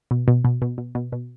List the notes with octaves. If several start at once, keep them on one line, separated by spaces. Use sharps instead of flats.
B2
B2
B2
B2
B2
B2
B2